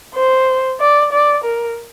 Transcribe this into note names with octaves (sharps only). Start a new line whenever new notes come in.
C5
D5
D5
A#4